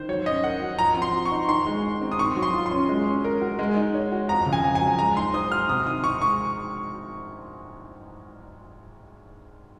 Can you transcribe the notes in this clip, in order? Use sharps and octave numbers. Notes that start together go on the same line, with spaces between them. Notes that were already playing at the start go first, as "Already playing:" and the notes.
Already playing: D#3 C5
F#3 C#5
C#4 D#5
A#4 F#5
F#4
F3 A#5
C4
C6
F#4
C#6
D#4
D#3 C6
G#3
D#4
C4
D#6
D#3 C#6
F#3
C6
F4
C6
C#4
G#3
C#4
A#4
F#4
G#3
D#4
C#5
F#4
F2 A#5
C#3
G#5
F2
G#5
F#3
G#3 A#5
D#4 C6
C5 D#6
F#4 F6
C3 D#6
D#3 D#6
D#4 C#6
G#3 C#6